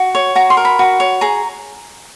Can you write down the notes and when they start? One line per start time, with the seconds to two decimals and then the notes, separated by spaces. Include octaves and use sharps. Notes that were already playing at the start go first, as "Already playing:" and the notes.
Already playing: F#4
0.15 C#5
0.35 F#4 A#5
0.50 C6
0.57 A#4
0.65 B5
0.79 F#4
1.00 C#5
1.21 G#4 A#5